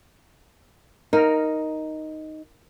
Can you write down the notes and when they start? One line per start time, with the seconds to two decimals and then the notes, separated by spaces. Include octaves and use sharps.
1.13 D#4 A#4